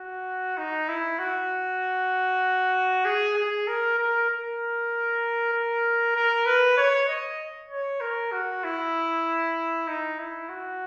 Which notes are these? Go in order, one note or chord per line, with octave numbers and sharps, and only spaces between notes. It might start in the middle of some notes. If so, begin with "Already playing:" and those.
Already playing: F#4
D#4
E4
F#4
G#4
G#4
A#4
A#4
A#4
A#4
A#4
B4
C#5
D#5
C#5
A#4
F#4
E4
D#4
E4
F#4